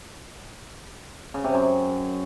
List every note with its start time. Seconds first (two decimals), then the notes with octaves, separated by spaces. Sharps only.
1.34 C#3
1.44 C3
1.54 F#2